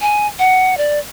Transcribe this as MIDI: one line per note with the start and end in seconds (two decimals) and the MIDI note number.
0.01 0.27 80
0.39 0.77 78
0.78 0.99 74